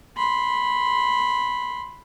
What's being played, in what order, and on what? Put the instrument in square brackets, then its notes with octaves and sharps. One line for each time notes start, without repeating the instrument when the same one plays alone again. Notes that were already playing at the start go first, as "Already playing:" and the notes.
[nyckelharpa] B5 C6